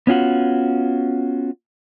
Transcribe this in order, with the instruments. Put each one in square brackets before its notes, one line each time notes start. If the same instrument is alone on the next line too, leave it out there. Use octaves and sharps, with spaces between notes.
[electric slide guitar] B3 C#4 F4 F#4